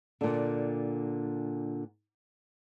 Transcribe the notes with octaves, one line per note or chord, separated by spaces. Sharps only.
A#2 D3